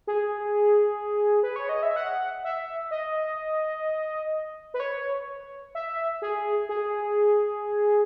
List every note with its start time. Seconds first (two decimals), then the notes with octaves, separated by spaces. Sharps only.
0.07 G#4
1.43 B4
1.56 C#5
1.69 D#5
1.83 E5
1.96 F#5
2.44 E5
2.91 D#5
4.74 B4
4.80 C#5
5.75 E5
6.22 G#4
6.69 G#4